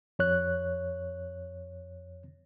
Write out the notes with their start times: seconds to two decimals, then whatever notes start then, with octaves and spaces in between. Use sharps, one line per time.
0.19 F2 C#5 F#6